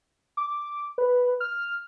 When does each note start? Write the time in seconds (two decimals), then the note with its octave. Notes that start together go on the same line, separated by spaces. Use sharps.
0.37 D6
0.98 B4
1.40 F6